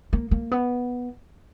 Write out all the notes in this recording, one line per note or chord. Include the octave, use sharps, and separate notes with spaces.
A#3
A#3
B3